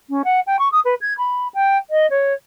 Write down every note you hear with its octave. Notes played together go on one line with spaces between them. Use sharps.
C#4
F#5
G5
C#6
D#6
B4
G#6
B5
G5
D#5
C#5